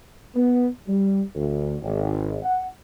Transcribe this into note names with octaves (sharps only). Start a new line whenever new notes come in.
B3
G3
D2
G#1
F#5